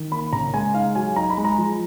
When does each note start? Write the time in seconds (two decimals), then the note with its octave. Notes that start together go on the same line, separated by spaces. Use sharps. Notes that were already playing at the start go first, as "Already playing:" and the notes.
Already playing: D#3
0.11 A#3 B5
0.33 C#3 A#5
0.54 G#3 G#5
0.74 D#4 F5
0.95 F#3 G#5
1.16 D#4 A#5
1.30 B5
1.37 G#3
1.45 A#5
1.58 F3